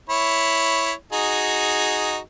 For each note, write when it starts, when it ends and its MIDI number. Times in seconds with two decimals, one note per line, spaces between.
0.10 0.92 64
0.10 0.92 73
0.10 0.92 83
1.13 2.18 63
1.13 2.18 66
1.13 2.18 68